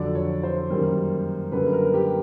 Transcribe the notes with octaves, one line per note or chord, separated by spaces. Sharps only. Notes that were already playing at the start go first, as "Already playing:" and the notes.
Already playing: F2 D3 F#3 D5
C#5
C5
F#2 D#3 G3 A#3
F#2 D3 G3 A#3 B4
A#4
G4